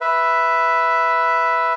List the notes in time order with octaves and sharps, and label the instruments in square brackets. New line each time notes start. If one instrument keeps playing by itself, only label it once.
[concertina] B4 E5